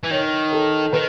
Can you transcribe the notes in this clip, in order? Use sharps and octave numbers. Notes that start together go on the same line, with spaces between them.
E3
D#3 C#5
A4
D#3 B4